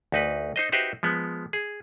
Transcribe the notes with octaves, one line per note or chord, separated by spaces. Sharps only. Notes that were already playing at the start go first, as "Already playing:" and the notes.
D2 D#4 B4
D#4 C5 D#5
D#4 F#4 G4 B4 C5 E5
F3 G#3 B3
G#4